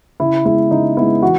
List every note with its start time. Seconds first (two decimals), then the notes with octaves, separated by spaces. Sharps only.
0.20 C#3 E4
0.45 G#3 B3 E4
0.71 C#3 D#4
0.97 G#3 B3 E4
1.22 E3 F#4